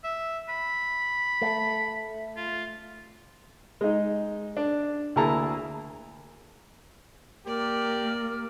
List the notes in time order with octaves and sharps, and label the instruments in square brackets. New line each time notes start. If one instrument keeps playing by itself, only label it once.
[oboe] E5
B5
[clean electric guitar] A3
[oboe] F4
[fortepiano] G#3 D#4
D4
D2 A#3 E4 G#4 A5 A#5
[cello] A#3 [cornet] G4 [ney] A#4 [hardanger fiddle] D5